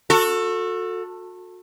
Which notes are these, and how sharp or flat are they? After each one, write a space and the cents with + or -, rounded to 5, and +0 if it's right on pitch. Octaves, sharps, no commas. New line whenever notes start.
F#4 -30 A4 +15